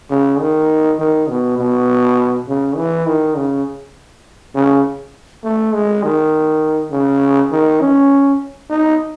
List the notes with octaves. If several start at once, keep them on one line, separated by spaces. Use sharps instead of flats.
C#3
D#3
D#3
B2
B2
C#3
E3
D#3
C#3
C#3
A3
G#3
D#3
C#3
D#3
C#4
D#4